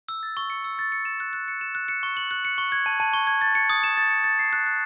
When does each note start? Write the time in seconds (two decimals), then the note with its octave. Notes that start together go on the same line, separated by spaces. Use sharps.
0.09 E6
0.23 A6
0.37 C#6
0.50 C#7
0.64 E6
0.79 A6
0.92 C#7
1.05 E7
1.20 F#6
1.33 F#6
1.48 C#7
1.61 E7
1.75 F#6
1.88 C#7
2.03 C#6
2.17 F#7
2.31 F#6
2.45 C#7
2.58 C#6
2.72 G#6
2.86 A5
3.00 A5
3.13 C#6
3.27 G#6
3.41 A6
3.55 C#7
3.70 D#6
3.84 E7
3.97 A6
4.10 C#7
4.24 A6
4.39 C7
4.53 F#6
4.66 F#6